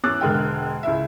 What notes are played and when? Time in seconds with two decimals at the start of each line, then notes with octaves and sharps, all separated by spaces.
0.03 E2 C#4 D6 E6 F#6 A6
0.21 E1 D3 G#3 A#4 F#5 G5
0.83 C#2 E4 E5